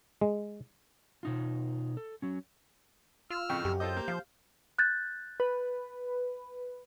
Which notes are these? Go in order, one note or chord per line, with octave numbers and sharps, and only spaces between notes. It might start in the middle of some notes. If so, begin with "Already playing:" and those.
G#3
B2 D#4 F4
A4
F#3 C#4
F4 E6 F6
F2 A2 C#3 G5
F#2 G4
F4 A4 C5 D#5 G6
A#3
F3 F5
F#6 G6 A6
B4